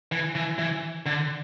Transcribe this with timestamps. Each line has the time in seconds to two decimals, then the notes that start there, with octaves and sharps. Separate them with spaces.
0.12 E3
0.35 E3
0.59 E3
1.06 D3